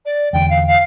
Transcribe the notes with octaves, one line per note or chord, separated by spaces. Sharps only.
D5
E2 D3 G5
F5
F5